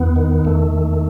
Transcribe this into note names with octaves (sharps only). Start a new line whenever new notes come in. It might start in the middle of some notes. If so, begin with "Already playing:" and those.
Already playing: E2 B3
D#3
E2 A3
D#3